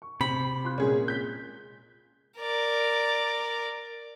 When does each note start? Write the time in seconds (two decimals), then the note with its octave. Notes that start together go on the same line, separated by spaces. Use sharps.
0.02 C#6
0.21 C3 B5
0.64 F4 C6 F#6
0.78 A#2 G#3 C#4 G#4
1.08 G6 B6
2.38 A#4 D5